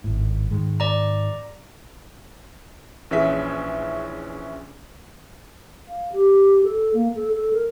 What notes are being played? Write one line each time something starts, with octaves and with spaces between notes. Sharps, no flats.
G#1 A2
G#2 D#3 G#3
D5 A#5
A#1 E3 C#4 G#4 E5 B6
F5
G4
A4
A#3
A4
A4
A#4